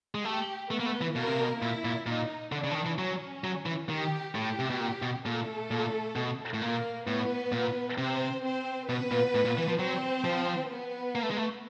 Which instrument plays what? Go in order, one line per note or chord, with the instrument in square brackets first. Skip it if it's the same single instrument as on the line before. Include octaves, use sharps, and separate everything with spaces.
[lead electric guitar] G#3
[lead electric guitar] A3 [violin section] G4
[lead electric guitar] A3 [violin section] B3 B4
[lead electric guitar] A#3
A3
E3
[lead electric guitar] B2 [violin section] A#3 A#4
[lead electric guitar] C3
B2
[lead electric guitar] A#2 [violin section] E4
[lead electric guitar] A#2
[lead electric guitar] A#2 [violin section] D#4
[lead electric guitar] D3 [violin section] D4
[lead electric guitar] C#3
E3
D#3
E3
[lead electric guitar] F#3 [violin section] C#4
[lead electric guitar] F#3
E3
[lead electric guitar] D#3 [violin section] G4
[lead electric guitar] A2 [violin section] G4
[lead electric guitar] C3
B2
A#2
B2
[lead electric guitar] A#2 [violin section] A3 A4
[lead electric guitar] A#2
B2
A2
[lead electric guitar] A#2 [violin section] A#3 A#4
[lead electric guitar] A2 [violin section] B3 B4
[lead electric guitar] A#2
[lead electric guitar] C3 [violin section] C4 C5
[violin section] C4 C5
[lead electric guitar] B2 [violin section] B3 B4
[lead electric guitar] A#2
A2
A#2
E3
F3
[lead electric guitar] F#3 [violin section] C4 C5
[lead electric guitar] F3
[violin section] B3 B4
[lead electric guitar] A#3
A3
G#3
A3